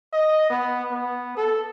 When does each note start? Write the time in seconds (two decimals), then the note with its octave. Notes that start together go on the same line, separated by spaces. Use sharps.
0.13 D#5
0.50 B3
0.91 B3
1.37 A4